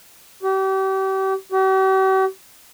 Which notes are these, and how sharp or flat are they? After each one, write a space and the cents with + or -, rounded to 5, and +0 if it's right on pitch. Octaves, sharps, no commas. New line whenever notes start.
G4 -35
G4 -45